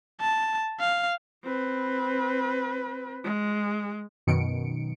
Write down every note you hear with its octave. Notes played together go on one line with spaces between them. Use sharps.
A5
F5
C4 B4
G#3
F#2 B2 D#3 C#7 D7